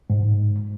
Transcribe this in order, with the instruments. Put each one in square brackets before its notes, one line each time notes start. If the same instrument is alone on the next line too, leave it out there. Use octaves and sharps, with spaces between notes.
[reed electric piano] G#2